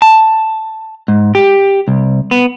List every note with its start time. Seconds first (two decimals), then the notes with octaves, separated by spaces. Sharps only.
0.02 A5
1.08 G#2
1.35 G4
1.88 C2
2.31 B3